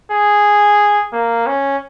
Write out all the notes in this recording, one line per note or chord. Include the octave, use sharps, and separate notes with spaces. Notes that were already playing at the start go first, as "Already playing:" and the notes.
G#4
A#3
C#4